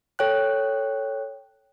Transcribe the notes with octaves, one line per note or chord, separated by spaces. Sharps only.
A4 C#5 G5 F#6